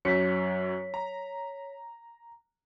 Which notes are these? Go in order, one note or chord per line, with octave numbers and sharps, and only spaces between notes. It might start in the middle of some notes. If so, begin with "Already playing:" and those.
F#2 F#3 C#5 B6 C#7
A#5